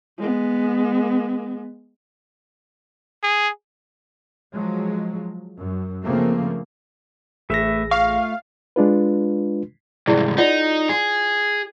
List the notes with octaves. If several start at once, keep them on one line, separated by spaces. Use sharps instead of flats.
G#3 B3
G#4
F3 F#3 G#3
F#2
C#3 F3 A3 A#3 C4
A1 A3 G#4 B4 E5 A#6
A3 F4 F5 C#6
G#3 D4 F4 B4
C2 G#2 E4 G#4 D5
D#4 F4 D5 F#5
G#4